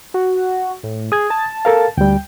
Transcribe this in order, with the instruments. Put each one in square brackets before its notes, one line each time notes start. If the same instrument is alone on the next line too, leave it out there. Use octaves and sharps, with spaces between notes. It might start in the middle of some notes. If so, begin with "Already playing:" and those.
[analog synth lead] F#4
A2
[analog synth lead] G#4 [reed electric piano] D#6 G#6
[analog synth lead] A5
[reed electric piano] A4 A#4 F5
[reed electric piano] D2 G3 [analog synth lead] G5